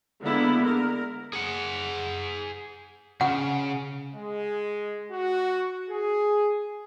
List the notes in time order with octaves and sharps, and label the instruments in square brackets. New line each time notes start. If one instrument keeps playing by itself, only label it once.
[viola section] D3 G#3 A#3 B3 E4
A#4
[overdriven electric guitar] G#4 F#5
[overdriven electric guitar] C#3 [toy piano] F#5
[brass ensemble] G#3
F#4
G#4